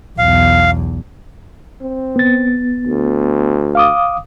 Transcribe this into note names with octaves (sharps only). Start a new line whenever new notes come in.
B1 E2 F5
C4
B3 A6
D2
F5 D6 D#6